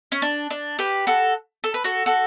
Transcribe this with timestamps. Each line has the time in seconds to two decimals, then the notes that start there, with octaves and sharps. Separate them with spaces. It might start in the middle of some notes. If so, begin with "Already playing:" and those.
0.12 C#4
0.22 D4
0.50 D4
0.79 G4 B4
1.07 F#4 A4
1.64 A4
1.74 B4
1.84 F#4 A4
2.06 F#4 A4